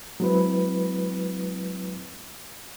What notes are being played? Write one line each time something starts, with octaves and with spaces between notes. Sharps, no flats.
F#3 G#3 C4 E4 B4